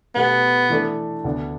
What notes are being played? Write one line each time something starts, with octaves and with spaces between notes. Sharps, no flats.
B2 A3 B3 G4 B4
E3 A3 D4 A4
D2 D3 B3 D4